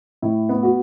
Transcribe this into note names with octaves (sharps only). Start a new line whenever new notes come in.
A2 E4
B3
F#4